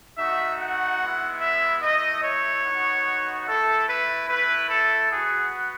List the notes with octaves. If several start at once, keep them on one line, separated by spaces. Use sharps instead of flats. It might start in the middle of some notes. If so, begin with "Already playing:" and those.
A3 D#4 F#4 E5
F#5
G#3 B3 E4
E5
A3 E4 D#5
C#5
B3 D#4 F#4
A3 E4 A4
B4
A3 E4 B4
A4
B3 F#4 G#4